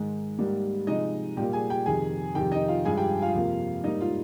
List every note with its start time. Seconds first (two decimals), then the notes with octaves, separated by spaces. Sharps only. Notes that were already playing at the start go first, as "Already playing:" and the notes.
Already playing: G#2 D#3 G#3
0.39 G#2 G3 A#3 G4
0.87 C3 F3 G#3 D#4 D#5
1.37 A#2 G3 A#3 G4 G5
1.53 G#4 G#5
1.70 G4 G5
1.86 F2 C3 D#3 G#4 G#5
2.35 F2 C3 D#3 G4 G5
2.52 D#4 D#5
2.68 F4 F5
2.85 G2 F3 G#3 G#4 G#5
2.97 G4 G5
3.22 F4 F5
3.34 F2 C3 F3 A#3
3.84 G#2 G3 A#3 D#4 D#5
4.01 F4 F5